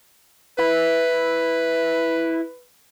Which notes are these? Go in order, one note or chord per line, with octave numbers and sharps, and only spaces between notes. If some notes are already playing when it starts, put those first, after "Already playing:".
E4 B4